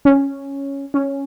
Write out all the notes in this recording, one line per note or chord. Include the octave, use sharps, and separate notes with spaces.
C#4
C#4